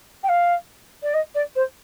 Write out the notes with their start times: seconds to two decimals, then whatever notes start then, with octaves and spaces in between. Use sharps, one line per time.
0.23 G5
0.29 F5
1.03 D5
1.14 D#5
1.35 D5
1.55 C5